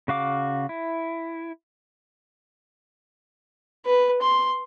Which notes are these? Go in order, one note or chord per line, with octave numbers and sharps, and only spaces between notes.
C#3 F#4 F5 D6
E4
B4
C6